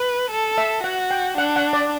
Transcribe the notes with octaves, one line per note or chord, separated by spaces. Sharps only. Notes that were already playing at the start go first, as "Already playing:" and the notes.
Already playing: B4
A4
E5
F#4 F#5
G5
D4 F#5
F#5
D5